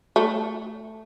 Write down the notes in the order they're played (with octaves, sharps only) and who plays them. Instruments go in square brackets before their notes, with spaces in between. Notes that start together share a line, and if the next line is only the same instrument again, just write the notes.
[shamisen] A3